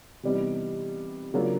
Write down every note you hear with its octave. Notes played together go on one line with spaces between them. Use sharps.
C3 E3 G3 B3 D#4
C#3 F#3 A#3 D4 F4